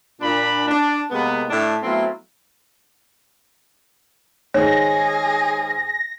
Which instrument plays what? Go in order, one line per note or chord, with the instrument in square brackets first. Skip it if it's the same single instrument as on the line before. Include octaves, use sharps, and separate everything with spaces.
[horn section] A#2 D4 B5
D4
C3 G#3 A#3 B3
A2 D4 A4
F#3 A3 B3 C4 E4 F4
[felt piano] G#2 D#3 G#3 [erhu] G#4 [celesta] C#5 [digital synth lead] A#6